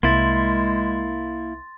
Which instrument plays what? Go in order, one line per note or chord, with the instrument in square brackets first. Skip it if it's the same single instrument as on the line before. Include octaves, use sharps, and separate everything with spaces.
[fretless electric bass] C2 [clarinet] G#3 [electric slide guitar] A#3 E4 [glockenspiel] C6 A6